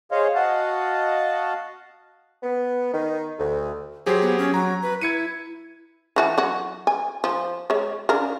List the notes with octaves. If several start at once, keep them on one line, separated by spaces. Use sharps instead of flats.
G#4 C5 C#5 D#5 F5
F#4 D#5 F5 F#5 A5
B3
D#3
D2
F#3 G4 G#4 C5
B3
C#4
F#3 A#5
B4
E4 G#6 C#7 D#7
E3 F#4 A5
F#3 F#4
G#5
F3
G#3 C#5
C#3 D4 A#4